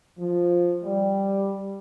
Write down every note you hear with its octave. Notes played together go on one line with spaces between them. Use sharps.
F3
G3